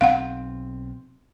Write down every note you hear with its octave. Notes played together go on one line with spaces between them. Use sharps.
B1 C4 F5 F#5